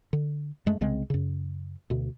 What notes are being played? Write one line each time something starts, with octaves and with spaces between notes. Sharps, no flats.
D3
F#2 G#3 A3
C2 C#3 G#3 C4
F#2 C#3
D2 B2